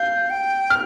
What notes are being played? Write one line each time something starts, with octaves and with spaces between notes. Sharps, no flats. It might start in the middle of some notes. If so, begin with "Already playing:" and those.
Already playing: F5 G6
G5
F6